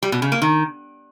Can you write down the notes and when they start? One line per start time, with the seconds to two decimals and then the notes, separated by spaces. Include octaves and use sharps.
0.03 G3
0.12 B2
0.22 C#3
0.32 A#3
0.42 D#3